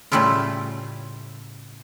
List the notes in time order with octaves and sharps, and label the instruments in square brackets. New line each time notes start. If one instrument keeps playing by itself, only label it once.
[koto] A2 C#3 G3 A3 E4 F4